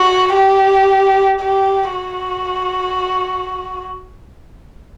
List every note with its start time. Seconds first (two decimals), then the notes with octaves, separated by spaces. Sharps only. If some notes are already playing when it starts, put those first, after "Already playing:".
Already playing: F#4
0.35 G4
1.41 G4
1.92 F#4